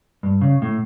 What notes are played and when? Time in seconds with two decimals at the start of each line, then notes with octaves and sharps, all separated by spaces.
0.23 G2
0.41 C#3
0.62 A2